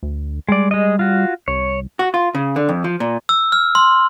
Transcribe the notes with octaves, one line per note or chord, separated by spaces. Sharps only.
D2
G3 G#3 D5
G#3 D#5
F4 F#4
C2 C#5
F#4
F4
C#3
D3
F2
F3
A#2
E6
F6
C6